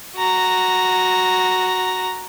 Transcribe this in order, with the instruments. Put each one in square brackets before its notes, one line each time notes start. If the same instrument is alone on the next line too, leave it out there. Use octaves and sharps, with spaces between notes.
[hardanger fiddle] F#4 A#5